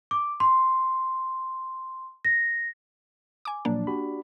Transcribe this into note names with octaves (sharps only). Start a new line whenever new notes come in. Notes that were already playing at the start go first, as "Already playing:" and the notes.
D6
C6
A#6
G#5 D6
A#2 F3 F#3 A#3 D4
F#4 G4 B5